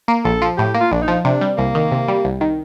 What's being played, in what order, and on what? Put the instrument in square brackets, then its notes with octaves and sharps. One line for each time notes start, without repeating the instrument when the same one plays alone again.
[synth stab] A#3
[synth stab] A#1 [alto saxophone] A4
[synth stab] F3
[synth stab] A2 [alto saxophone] G4
[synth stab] A#3
[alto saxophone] F4
[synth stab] A#1 [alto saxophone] D4
[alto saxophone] D#4
[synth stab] F3
[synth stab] C3 [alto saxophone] D4
[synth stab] G3
[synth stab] C2 [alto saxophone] A#3
[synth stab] D#3
C3
G3
C2
D#3